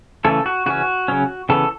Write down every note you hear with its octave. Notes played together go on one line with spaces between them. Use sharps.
C#3 E3 A3 C#4 A4
F#4
C#3 E3 C#4 F#4
C#3 F#3 C#4
C#3 E3 B3 A4